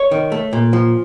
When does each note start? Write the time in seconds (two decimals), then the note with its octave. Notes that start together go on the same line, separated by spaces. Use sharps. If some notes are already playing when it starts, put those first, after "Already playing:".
Already playing: C#5
0.11 D#3
0.32 A3
0.53 A#2
0.73 F3